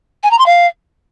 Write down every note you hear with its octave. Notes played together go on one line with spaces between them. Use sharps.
G#5
A#5
C6
F5